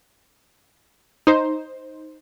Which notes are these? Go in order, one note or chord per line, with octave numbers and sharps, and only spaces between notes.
D#4 C5